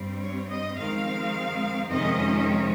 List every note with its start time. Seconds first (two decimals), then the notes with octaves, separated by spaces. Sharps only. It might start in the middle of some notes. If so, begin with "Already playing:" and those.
Already playing: G2 G3 C4
0.21 C#5
0.49 D#5
0.77 F2 D#3 G#3 C4 F5
1.90 F2 C3 D#3 G#3 C#4 D#5